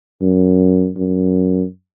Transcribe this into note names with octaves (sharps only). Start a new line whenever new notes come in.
F#2
F#2